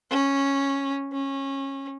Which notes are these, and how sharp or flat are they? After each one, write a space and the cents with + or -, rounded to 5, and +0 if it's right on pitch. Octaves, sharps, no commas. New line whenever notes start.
C#4 -5
C#4 -20